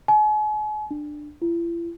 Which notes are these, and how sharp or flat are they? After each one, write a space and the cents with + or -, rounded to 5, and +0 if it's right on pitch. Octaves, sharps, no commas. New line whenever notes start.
G#5 +40
D4 +15
E4 +45